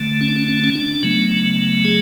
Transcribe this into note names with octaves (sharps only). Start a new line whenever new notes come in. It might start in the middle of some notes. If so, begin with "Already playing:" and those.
Already playing: D3 A3
C#4
D4
C#4
C#4
C#4
D4
C#3 F#3 A3 B3
G#4